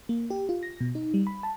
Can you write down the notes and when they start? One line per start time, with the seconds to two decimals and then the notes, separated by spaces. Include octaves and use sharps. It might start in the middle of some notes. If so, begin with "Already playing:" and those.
0.09 A#3
0.30 G4
0.49 F4
0.63 A#6
0.80 B2
0.95 D#4
1.14 G3
1.27 B5
1.43 A5